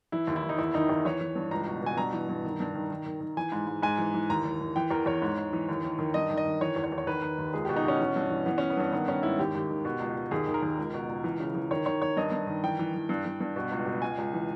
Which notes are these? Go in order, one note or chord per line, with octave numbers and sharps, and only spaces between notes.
E3 E4
D#2
E4
D#2
D#4
E2 E4
D#3 D#4
E2 E4
E3 C#5
E3
G2
C#2 A#5
B2
B2 G#5
G2 A#5
E3
G2
D#3
G2
D#3
D#3
D#3
D#3
E3 G#5
G#2
G#2
G#2 G#5
E3
E3
D#2 A#5
D#2
D#2
E3 G5
E2 A#4
E2 C#5
G#2
G#2
E3
D#2
D#3
D#3
G2 D#5
D#3
D#5
D#3
E3 C#5
E2
C#5
E2
C#5
D#3 B4
D#3
D#2
C#2 G#4
B2 G4
D#4
B2 C#4
E3
G2
E3
E3 B3
E3 C#4
B3
G2 C#4
D#3 B3
D#3 C#4
G#2 E4
D#2 G4
D#2
D#3
B2
C#2
C#2
D#2 G#4
D#3
A#4
D#2
C#2
B2
C#2
E3
C#3
E3
D#3 C#5
D#3 C#5
D#3 C#5
G2 D#5
G2
D#3
E3 G5
E3
E3
G2
G2
G2
B2
C#2
B2
C#2 G#5
C#2
E3